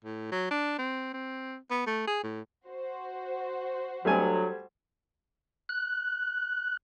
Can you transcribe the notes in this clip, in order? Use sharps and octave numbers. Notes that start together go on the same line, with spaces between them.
A2
F#3
D4
C4
C4
B3
A3
G#4
A2
F#4 C5
D2 F#3 G3 A3 G#5
F#6